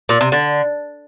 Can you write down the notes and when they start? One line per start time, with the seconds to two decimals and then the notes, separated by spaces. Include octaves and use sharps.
0.09 A#2
0.21 C3
0.32 D3